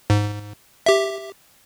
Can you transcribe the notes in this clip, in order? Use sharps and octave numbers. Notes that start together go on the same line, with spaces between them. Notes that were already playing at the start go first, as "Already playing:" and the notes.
G#2
G4 E5